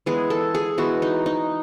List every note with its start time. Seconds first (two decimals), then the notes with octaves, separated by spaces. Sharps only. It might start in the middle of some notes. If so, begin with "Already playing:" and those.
0.06 E3 G#3 B3 G#4
0.30 A4
0.55 G#4
0.78 E3 G#3 B3 F#4
1.02 D#4
1.26 D#4